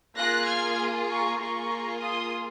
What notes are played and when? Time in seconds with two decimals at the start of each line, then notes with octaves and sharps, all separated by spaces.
0.16 A#3 F4 G#4 F#6 A#6
0.47 F6 G#6
1.09 A#5 C#6
1.40 A#3 F4 G#4 A#5 C#6
2.03 C6 D#6